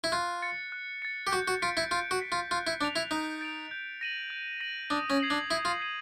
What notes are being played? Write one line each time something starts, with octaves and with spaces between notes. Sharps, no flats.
E4
F4 F#6
A6 C#7
F#6
A6 C#7
G4
F#4 G6
F#4
F4 B6 D7
E4
F4 G6
F#4
B6 D7
F4
F4 F#6
E4
D4 A6 D7 F7
E4
D#4 F#6
A6 D7 F7
G6
A#6 D#7 F#7
G6
A#6 D#7 F#7
D4 D#6
C#4
G#6 C7 D#7 F#7
D4
E4 D#6
F4
G#6 C7 D#7 F#7